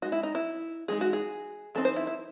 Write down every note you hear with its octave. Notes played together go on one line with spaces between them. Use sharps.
G#3 D#4 F#4
E4
D#4
E4
E3 G#3 D#4 G#4
F#4
G#4
E3 C4 D#4 A4
C5
E4
E4